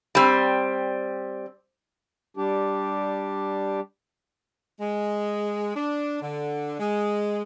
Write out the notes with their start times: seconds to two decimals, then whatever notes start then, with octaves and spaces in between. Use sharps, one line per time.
0.15 G3 C4
2.37 G3 D4 G4
4.80 G#3
5.75 D4
6.22 D3
6.80 G#3